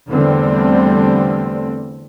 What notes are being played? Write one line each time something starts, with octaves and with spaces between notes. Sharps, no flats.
E2 D3 G3 A3 C4